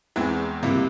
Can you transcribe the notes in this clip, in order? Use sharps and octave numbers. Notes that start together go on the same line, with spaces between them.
E2 E3 G#3 C4 E4
C#2 C3 G3 A#3 E4